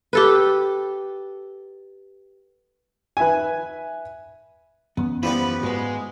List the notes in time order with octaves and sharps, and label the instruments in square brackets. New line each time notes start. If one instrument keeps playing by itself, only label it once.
[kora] G4 A4 B4
[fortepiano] B4 E5 G#5
[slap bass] F#2 E3 C#4 [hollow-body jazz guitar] B3
[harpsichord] F3 G3 B3 [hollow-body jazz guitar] E4 F#5 [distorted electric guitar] B4
[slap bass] G#2 [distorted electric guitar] G#3 [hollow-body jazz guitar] F#4 B4